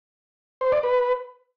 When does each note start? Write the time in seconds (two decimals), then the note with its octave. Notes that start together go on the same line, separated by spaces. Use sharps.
0.61 C5
0.72 D5
0.83 B4